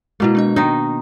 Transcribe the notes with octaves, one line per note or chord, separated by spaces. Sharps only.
B2 G#3 A#3 E4
G#3 D4 D#5
D#3 D4 D#4